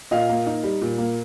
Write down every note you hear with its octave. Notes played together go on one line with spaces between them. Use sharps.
A#2 D#5 F5
A#3
D#4
G3
A#2
A#3